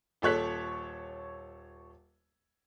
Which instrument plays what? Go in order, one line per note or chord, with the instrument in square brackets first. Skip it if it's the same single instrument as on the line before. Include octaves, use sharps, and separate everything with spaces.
[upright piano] D#1 A4 C#5 F#6 B6